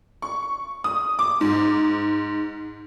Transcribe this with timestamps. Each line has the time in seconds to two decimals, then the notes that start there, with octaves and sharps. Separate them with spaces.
0.22 C#6
0.84 D#6
1.19 D6
1.41 G#2